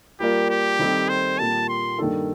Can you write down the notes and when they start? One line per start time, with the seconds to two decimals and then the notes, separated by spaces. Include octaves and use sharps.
0.20 G3 A#3 F4 G4 A#4 D5
0.50 G4
0.79 D#3 G3 C4 D#4 A4
1.09 C5
1.39 A#2 G3 A#3 A5
1.69 C6
1.99 G2 D#3 A#3 D4 A4